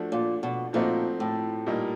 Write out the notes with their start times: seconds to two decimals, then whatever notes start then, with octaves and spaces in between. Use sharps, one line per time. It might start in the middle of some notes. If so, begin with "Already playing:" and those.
Already playing: F3 A3 D4 F#4
0.12 A#2
0.43 B2
0.73 A#2 F3 A3 C4 D#4 F#4
1.20 A2
1.67 A#2 G3 A#3 D#4